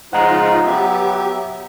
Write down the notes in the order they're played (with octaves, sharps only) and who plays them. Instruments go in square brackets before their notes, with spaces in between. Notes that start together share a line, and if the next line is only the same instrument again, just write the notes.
[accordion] C#3 D#4 F4 [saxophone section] F3 G#3 [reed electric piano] F#5 A#5
[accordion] F#3 B3 G4 [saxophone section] E5